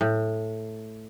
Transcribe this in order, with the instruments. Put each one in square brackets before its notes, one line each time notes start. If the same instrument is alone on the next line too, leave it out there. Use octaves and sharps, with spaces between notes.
[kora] A2